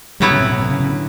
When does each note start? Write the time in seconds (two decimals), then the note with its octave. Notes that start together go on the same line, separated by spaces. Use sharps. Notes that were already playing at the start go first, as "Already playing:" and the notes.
0.20 A2 F#3 G3 B3 E4
0.31 C#3
0.41 C3
0.50 B2
0.60 C3
0.69 C#3
0.80 C#3
0.89 D3